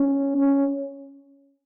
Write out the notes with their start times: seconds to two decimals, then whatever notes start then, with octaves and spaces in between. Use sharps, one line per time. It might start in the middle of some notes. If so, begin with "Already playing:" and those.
Already playing: C#4
0.37 C#4